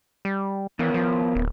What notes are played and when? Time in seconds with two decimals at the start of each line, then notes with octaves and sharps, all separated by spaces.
0.25 G3
0.79 E3 B3 A#4 C#5
0.94 F3
1.35 D1